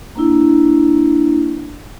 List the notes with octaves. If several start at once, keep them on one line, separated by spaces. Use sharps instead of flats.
A#3 D4 E4